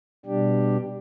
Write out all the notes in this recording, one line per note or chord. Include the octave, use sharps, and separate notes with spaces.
B2 G3 D4 G4